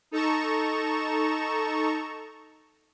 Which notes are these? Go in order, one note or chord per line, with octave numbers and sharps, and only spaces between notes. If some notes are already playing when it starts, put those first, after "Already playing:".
D#4 A4 A#5 C#6 E7